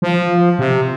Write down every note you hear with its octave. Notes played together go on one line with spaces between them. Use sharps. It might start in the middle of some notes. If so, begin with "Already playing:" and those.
F3
C3